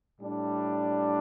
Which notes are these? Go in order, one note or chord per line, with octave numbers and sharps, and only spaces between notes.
A2 G3 D4